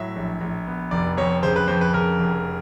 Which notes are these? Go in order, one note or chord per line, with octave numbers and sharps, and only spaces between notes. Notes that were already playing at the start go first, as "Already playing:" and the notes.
Already playing: A2 F#3 E5
A#1
A#1
B3
F1 D5
F2 C#5
C#3 C5
B4
F2 C5
B4
C#3 A#4
F1